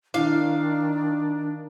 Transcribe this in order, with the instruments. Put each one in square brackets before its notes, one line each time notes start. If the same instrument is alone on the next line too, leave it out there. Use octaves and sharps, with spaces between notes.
[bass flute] D#3 [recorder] D4 [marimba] E4 [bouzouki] F5